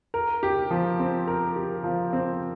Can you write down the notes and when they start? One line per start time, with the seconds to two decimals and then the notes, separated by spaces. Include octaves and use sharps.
0.14 A#4
0.43 G4
0.71 F3
0.99 C4
1.27 A#4
1.56 G4
1.84 F3
2.13 C4